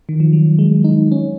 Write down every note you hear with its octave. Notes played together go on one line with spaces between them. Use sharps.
D#3
F3
F#3
G#3
D#4
C#4